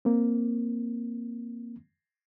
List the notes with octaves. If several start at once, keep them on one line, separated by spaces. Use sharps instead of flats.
A#3 C4